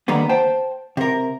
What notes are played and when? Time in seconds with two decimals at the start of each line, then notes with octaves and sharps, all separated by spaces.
0.08 D3 D#3 G3 A#3 B3
0.29 C5 G5 A5
0.97 C3 A#4